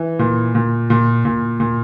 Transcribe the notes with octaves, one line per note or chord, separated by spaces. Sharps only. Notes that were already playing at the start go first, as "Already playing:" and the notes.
Already playing: E3
A#2
A#2
A#2
A#2
A#2